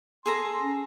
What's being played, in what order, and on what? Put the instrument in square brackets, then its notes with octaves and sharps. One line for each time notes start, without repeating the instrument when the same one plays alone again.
[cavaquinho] G#4 A4 A#5 [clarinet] C6
[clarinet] C#4